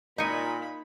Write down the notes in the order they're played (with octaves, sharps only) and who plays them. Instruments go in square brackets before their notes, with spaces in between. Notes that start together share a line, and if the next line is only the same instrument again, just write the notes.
[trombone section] A#2 [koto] D#4 G#5 [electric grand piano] D#5 C#7 [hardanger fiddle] B5